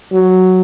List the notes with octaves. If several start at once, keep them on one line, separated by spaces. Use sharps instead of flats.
F#3